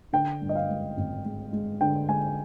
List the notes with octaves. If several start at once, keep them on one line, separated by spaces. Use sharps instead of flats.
D3 G5
G2
D#5
F5
G#3
G#1
G#3
G#3
D3 G5
G#3 G#5